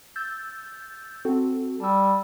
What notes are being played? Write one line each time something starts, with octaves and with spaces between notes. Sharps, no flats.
E6 G6 A6
C4 F#4 A4
G3 A5 E6